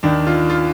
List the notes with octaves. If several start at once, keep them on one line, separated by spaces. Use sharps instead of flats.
D#2 D#3 D4
F4
F4